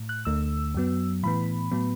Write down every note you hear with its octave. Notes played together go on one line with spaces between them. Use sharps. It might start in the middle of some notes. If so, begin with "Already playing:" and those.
Already playing: A2
F#6
D2 D3 A3 E6
F#2 F#3 B3
A2 E3 B3 B5
A2 F#3 B3